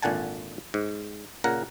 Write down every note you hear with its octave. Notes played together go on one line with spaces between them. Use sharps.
G#1 A#2 D3 F#5 G#5 A5
G#2
A#2 C#3 A#4 F#5 A#5